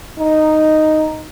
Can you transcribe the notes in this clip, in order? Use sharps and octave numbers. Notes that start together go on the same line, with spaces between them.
D#4